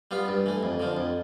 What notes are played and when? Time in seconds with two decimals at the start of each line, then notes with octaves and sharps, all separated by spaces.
0.11 G3 B3 F4
0.28 G2
0.46 E3 A3
0.63 F2
0.79 D3 F3
0.97 F2